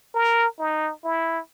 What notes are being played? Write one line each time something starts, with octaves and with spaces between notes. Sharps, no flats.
A#4
D#4
E4